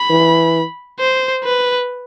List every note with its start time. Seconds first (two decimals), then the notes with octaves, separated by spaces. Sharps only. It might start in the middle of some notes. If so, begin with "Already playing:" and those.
Already playing: B5
0.10 E3
1.00 C5
1.44 B4